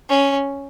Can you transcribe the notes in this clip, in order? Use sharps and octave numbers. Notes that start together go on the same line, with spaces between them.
C#4